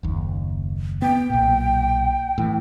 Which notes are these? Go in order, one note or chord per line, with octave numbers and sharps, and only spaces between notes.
F#1 D#2
B3 G5
B1 A#2
A2 E3